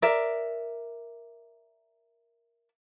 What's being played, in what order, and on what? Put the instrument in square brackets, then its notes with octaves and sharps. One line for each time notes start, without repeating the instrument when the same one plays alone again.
[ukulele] A#4 D5 E5